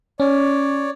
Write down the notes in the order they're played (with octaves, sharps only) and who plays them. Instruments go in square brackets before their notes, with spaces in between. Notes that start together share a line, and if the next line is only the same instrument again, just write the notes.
[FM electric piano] C#4 [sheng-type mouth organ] C#5 D5